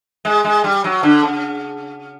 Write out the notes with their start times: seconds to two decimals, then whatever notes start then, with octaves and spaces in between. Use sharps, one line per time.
0.25 G#3
0.44 G#3
0.64 G3
0.84 F#3
1.03 D3
1.23 C#3